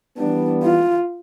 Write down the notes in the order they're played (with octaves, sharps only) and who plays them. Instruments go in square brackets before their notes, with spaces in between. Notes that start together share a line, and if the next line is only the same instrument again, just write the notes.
[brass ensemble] E3 G3 B3 [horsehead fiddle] D4
[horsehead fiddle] F4